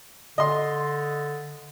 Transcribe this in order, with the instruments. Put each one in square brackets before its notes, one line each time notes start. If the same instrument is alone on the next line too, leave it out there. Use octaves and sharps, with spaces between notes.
[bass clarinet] D3 [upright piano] D#5 C6